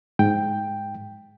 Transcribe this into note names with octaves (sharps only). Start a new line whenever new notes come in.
G#2 G5